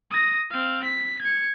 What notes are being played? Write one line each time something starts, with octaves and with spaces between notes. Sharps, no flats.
D#6 A#6
C4 F5
B6
G#6 C#7